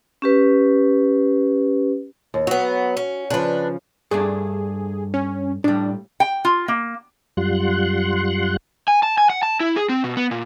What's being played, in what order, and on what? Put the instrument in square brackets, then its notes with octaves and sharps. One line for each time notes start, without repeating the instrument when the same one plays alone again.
[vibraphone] C#4 G4 B4
[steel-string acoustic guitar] D#2
[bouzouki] F#3 B3 [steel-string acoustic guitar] F#4
[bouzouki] C#4
[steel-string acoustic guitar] C#3 F3 [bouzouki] D4 B4
[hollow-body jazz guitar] G2 A3 D4 [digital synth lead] G#4
[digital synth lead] C#4
[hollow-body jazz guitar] A2 G3 [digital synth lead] D4
[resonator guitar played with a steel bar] G5
F4
A#3
[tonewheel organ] F#2 G3 F4 F#5 C6 F#6
[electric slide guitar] G#5
A5
G#5
F#5
A5
E4
G#4
C4
B2
B3
A#2